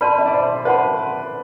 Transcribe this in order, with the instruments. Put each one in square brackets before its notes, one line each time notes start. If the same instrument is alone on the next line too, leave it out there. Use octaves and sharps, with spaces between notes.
[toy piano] B4 D5 A5 C6 [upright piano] B5
[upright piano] E5
D5
C5
[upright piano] B4 [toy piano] C5 F#5 A5 C6